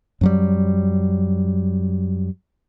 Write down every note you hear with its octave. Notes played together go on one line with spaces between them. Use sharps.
F#2 F#3 G3